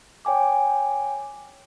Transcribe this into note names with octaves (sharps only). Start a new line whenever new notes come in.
C#5 G5 G#5 D6